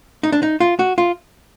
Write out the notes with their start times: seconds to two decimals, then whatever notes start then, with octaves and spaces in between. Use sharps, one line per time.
0.23 D#4
0.32 D4
0.43 D#4
0.60 F4
0.79 F#4
0.98 F4